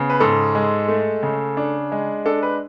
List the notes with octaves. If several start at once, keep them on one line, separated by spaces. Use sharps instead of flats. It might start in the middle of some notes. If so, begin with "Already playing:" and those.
Already playing: C#3 B3
B4
G#2 A4
G#3
A3
C#3
D4
G#3
D4 A4
B4